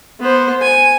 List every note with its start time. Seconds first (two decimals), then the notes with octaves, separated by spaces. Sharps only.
0.20 B3 C5
0.62 G#5